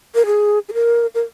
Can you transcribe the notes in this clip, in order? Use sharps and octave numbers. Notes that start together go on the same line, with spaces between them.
A#4
G#4
G#4
A#4
A#4